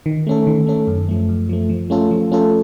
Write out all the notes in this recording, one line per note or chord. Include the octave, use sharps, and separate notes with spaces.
D#3
A3 C#4 A4
D#3
A3 C#4 A4
F#2
F3 A3
F#2
F3 A3
F3
A3 C#4 F4 A4
F3
A3 C#4 F4 A4